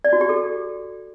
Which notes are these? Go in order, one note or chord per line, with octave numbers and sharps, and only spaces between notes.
D5
F#4
G4
A4